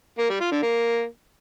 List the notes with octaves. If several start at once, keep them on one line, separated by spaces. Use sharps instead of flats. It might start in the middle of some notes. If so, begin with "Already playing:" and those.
A#3
G3
F4
D3
A#3